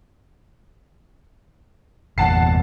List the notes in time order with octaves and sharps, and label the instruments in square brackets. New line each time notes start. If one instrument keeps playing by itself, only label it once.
[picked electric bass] G1 E2 A#2 [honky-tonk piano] F#5 A5 C7